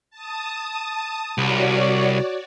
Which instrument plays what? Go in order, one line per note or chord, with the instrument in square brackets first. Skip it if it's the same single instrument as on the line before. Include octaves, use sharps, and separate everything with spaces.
[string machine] A5 D#6
[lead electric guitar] C2 [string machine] F#4 C#5 D5